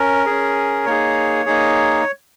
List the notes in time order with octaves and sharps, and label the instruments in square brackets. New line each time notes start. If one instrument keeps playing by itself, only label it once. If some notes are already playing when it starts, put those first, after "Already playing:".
Already playing: [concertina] C#4 A#4
C#4 G#4
A#3 D#4 G#4 C#5
A#3 D#4 G#4